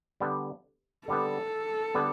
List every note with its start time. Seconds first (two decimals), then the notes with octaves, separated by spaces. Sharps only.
0.20 D3 G3 B3
1.08 D3 G3 B3 A4
1.94 D3 G3 B3